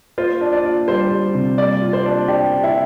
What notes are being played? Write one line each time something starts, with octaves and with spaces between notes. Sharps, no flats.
F4 C5
D4
D5
F4
G3 C5
G3
C3
G3 D5
F4
C5
D4
D4 G4
D4
E4